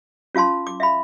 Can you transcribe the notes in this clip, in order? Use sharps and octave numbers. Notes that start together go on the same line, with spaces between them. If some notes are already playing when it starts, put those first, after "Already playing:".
C#4 F4 F5 A5 C6
D6
E5 F5 B5